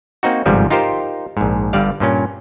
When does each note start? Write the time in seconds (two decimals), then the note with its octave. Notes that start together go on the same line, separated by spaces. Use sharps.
0.23 A#3 C4 D#4 F#4
0.46 G1 G#2 C3 F3 G3
0.70 D#4 F4 G4 A#4 C5
1.37 A#1 G#2
1.73 G1 G2 G3 D5 F5
2.00 G2 A#2 C#4